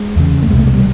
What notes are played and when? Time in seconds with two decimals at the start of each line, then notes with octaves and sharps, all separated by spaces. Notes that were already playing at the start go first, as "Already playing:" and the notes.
Already playing: G#3
0.16 E2 C#3
0.43 A3
0.49 C2 B2 G#3
0.58 A3
0.67 G#3
0.75 G3